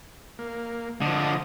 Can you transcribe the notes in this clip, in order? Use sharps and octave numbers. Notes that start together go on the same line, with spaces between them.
A#3
D3 F3 D#5